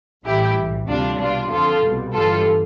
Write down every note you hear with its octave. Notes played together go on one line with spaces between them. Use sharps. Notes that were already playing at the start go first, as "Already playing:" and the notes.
A1 A2 E3 G3 E4 G4
B1 A2 E3
D2 C3 E3 G3 D4 F4
C2 B2 G3 D4 F4
F2 D3 F3 F4 A4
C2 B2 G3
G1 G2 E3 G3 F4 A4